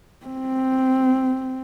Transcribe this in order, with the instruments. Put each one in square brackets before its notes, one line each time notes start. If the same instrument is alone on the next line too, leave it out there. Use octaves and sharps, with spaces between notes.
[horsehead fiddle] C4